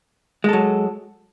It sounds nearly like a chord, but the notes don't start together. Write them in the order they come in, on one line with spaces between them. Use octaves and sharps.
G#3 A4 F#3